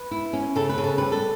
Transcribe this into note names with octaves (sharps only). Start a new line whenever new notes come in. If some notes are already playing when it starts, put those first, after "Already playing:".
Already playing: B4
E4
C#4
C#3 A4
B4
C#3
A4
G3 B4
A4